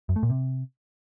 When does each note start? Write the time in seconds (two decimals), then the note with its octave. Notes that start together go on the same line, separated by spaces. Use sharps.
0.09 F#2
0.16 A3
0.23 A#2
0.30 C3